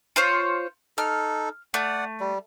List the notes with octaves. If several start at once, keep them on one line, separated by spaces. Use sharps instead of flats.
F4 C5 C#5
D#4 A4 F6
A3 D5 F#5
G3